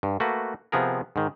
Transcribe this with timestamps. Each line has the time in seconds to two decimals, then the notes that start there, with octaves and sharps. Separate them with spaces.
0.03 G2
0.20 A3 A#3 F#4 B4
0.72 C3 F3 B3 G#4 A#4
1.16 G#2 D#3